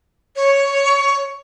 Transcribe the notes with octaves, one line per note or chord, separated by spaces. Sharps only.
C#5